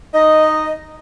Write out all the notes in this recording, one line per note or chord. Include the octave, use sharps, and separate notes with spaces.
D#4 D#5